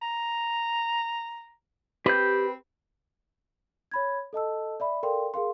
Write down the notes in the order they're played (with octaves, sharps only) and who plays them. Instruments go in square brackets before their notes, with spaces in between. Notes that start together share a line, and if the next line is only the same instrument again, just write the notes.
[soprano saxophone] A#5
[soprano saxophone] C4 [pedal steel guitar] G4 G6 [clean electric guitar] B4
[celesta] C#5 B5 G#6
A4 D#5 A5 E6
D5 E5 B5
A4 A#4 D5 F5 G5 C6
G#4 A#4 F5 C6